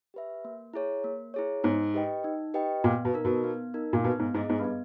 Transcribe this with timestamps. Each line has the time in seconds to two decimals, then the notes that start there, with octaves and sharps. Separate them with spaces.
0.14 G4 B4 E5
0.45 A#3
0.73 E4 G#4 C#5
1.04 A#3
1.34 E4 G#4 C#5
1.63 G#2 D#4
1.94 G4 B4 D#5 G5
2.24 D#4
2.54 G4 B4 D#5 G5
2.84 A#2 B3
3.05 B2
3.14 D#4 A#4
3.25 B2
3.44 B3
3.74 D#4 A#4
3.93 A#2
4.04 B2 B3
4.19 G#2
4.34 G#2 E4 G#4 D#5
4.49 G#2
4.59 G2
4.64 B3